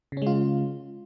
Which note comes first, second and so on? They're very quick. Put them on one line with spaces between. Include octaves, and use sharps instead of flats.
C#3 C#4 G#3 F4